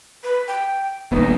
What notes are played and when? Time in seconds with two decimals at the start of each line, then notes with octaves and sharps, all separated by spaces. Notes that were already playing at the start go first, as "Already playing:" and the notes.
0.24 B4
0.48 G5
1.12 D#1 A#1 B3 D#4